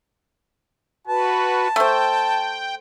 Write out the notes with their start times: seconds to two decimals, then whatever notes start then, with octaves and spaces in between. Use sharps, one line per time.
1.08 F#4 B4 A5
1.76 A3 C5 G5